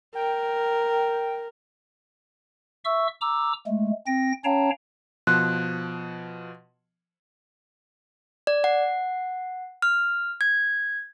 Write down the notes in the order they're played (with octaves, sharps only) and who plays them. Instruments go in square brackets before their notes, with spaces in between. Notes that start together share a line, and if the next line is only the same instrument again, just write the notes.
[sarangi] A#4 [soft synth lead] G5
[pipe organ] E5 C#6 E6
A#5 D6 E6
G#3 A3
C4 G5 A#6
C#4 C#5 F5 G5 A5 A#5
[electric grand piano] B2 F3 C6 [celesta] F#6
[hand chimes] D5
F#5
F6
G#6